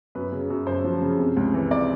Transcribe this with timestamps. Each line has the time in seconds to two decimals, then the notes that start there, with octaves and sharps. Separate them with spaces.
0.15 F#2 B4
0.32 C#3
0.50 F#2
0.67 F#2 C5
0.84 F3
1.02 C#3
1.18 C3
1.37 C#2
1.54 E3
1.71 C3 D5